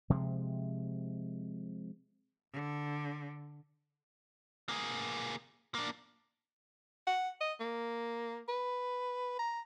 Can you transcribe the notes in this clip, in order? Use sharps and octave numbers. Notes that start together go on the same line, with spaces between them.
C3 F3 G#3
D3
A#3 G#4
A#3 D4
F#5
D#5
A#3
B4
A#5